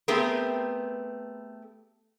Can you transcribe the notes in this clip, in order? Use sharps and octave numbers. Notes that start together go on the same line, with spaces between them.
A3 B3 C4 G4 G#4 A#4